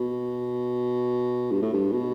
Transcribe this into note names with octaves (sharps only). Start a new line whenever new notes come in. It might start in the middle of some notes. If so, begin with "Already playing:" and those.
Already playing: B2
G2
A2
G2
B2